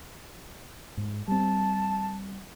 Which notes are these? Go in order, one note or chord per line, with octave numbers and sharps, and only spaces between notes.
G#2
G3 C4 A5